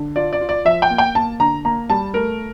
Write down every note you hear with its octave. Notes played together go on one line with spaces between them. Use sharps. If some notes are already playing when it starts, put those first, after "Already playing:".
Already playing: D3
F4 D5
D5
F4
D5
F3 E5
G5
A#3
G5
A#3 A5
D3 A#5
A#3 A#5
G3 A5
A3 A#4